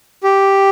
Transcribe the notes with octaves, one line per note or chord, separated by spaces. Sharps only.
G4